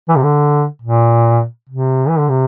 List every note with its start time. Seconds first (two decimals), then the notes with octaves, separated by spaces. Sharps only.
0.09 E3
0.16 C3
0.23 D3
0.82 A#2
1.70 C3
2.09 E3
2.19 D3
2.29 C3